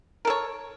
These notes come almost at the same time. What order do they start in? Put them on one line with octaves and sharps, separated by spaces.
A#4 A4 C#5